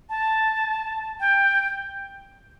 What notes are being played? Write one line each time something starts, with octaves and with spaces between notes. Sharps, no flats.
A5
G5